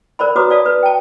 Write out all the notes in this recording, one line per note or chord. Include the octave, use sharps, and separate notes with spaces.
A#4 C5 D5 B5
F#4 B4 C#5 A#5 D6 D#6
D5 F5 A5 D#6
B4
G5 A5